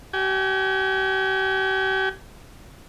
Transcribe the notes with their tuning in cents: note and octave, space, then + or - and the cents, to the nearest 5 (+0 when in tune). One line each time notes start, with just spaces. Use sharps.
G4 -40 G#5 +0